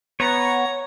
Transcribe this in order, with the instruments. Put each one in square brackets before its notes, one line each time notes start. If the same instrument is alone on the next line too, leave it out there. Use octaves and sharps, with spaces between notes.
[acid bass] B3 [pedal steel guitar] C#5 [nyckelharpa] A#5